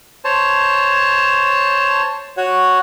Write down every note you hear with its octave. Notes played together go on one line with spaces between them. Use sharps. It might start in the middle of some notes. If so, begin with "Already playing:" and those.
C5 C#5 A5
F#4 C#5